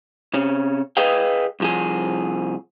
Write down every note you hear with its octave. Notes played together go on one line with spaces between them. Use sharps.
C3 C#4
G#4 B4 D#5 F5 G5
C2 F3 G#4